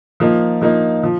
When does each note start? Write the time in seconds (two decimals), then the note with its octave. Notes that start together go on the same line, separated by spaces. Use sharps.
0.20 F3 A#3 D#4
0.61 F3 A#3 D#4
1.03 F3